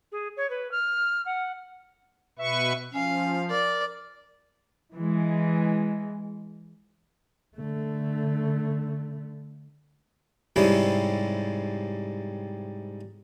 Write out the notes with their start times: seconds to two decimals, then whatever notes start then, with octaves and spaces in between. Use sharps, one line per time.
0.12 G#4
0.37 C#5
0.50 B4
0.72 F6
1.26 F#5
2.39 B2 B4 E5 C#6
2.94 F3 C#4 F5
3.50 A#4 D5
4.93 E3 G#3
7.57 D3 A3
10.56 G#2 C3 G3 C#4 E4